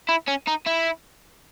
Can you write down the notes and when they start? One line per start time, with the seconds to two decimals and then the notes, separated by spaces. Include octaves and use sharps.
0.09 E4
0.28 C#4
0.48 D#4
0.67 E4